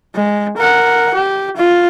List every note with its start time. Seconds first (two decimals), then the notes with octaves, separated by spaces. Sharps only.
0.15 G#3
0.57 A#4 F#5
1.15 G4
1.57 F4